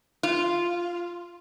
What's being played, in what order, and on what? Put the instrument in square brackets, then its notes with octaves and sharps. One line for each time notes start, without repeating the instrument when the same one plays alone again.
[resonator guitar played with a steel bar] F4